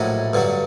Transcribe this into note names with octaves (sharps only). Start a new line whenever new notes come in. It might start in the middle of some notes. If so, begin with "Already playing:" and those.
Already playing: A#1 A2 F#3 D#5
G2 D3 F#3